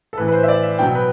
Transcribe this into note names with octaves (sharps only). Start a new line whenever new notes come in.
A4
A2 E3 B4
B4
C5
E5
D5
E5
B2 F#3 G5
B4